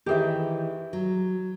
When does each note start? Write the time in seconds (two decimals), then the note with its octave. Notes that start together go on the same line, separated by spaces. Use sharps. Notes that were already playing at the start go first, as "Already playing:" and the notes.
0.06 D#3 E3 G4 G#4 E5
0.93 F#3